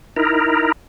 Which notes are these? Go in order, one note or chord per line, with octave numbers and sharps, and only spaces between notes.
D#4 E4 A#4